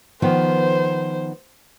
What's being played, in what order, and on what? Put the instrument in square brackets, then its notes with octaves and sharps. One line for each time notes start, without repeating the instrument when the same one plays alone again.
[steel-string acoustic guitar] D#3 F3 B3 [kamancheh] C5